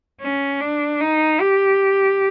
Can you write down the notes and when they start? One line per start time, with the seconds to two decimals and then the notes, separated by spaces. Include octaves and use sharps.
0.21 C#4
0.61 D4
1.01 D#4
1.40 G4